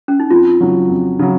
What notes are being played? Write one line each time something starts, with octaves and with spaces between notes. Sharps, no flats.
C#4
D#4
F2 F4
C#3 F#3
F2
C#3 F#3